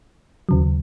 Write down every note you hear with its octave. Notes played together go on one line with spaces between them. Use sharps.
D#2 C#3 F#3